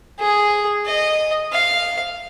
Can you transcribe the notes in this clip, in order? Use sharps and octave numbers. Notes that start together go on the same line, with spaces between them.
G#4
D#5
F5